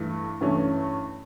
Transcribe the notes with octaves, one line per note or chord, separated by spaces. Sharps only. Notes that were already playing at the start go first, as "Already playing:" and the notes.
Already playing: G2 E3 A3
G2 E3 A3 C#4